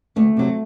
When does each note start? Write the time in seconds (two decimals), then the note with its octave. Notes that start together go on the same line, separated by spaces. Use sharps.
0.16 D2 A3
0.37 C3 F#3